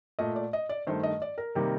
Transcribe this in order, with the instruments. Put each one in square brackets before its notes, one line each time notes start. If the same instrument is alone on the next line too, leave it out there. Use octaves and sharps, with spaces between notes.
[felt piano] A#2 A3 D#5
D5
D#5
D5
G2 D#3 A3 C5
D#5
D5
A#4
C3 D#3 G3 A#3